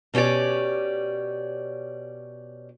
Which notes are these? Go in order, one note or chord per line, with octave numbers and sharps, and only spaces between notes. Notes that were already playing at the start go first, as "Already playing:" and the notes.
B2 C#4 G4 C#5 D5